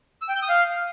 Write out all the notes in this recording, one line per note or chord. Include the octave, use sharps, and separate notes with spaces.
E6
G5
G6
D#6
F5